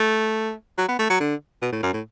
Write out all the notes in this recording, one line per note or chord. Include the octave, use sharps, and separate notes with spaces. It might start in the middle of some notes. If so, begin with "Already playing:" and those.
Already playing: A3
F#3
B3
A3
F#3
D3
B2
A2
F#2
A2